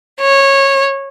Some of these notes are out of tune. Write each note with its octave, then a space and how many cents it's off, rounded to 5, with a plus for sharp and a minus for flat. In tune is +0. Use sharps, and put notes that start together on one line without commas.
C#5 -15